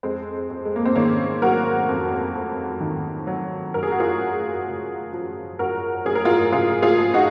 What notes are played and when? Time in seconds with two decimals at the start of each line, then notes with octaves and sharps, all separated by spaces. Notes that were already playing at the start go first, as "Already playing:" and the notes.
0.03 F2 G#3 C4
0.50 F2
0.65 G#3
0.76 A#3
0.85 C4
0.96 D#3 A#3 C#4
1.42 F#3 F#4 A#4
1.89 F2
2.35 F2
2.81 D#3
3.27 F#3
3.74 F#2 A#4
3.83 G#4
3.91 F#4
4.00 F4 G#4
4.20 F#2
4.67 C#3
5.13 F3
5.59 F#2 F#4 A#4
6.05 F#2 G#4
6.15 A#4
6.25 F4 G#4
6.52 C#3 F4 G#4
6.82 F4 G#4
6.98 F3
7.14 D#4 F#4